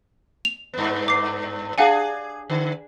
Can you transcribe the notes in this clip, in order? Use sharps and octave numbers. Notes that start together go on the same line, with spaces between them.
F7
G2 B3
D6 C7
D4 G#4 F5 F#5 G#5
D3